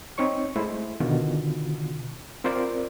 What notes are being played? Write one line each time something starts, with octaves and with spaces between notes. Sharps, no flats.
C4 D#4 C#5 C#6
G#3 A3 E4 C5
B2 D3 D#3 F4 F#4
C4 F4 A#4 C5 D5